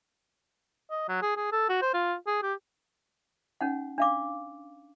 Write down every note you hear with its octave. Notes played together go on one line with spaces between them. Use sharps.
D#5
F#3
G#4
G#4
A4
F#4
C5
F4
G#4
G4
C#4 D#4 F#5
D4 F5 D6